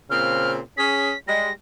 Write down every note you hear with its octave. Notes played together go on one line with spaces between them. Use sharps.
A#2 C#3 C4 F6
C#4 G#4 B6
G3 G#3 A#6